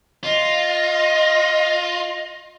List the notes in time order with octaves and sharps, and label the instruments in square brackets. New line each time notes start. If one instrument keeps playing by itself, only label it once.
[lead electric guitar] F4 [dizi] D#5